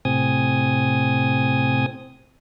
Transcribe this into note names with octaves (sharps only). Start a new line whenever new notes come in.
A2 C3 C4 G#5 D#6